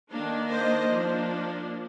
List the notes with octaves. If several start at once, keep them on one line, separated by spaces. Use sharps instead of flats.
D#3 A#3 D4
C5 D#5
F3 A#3 D4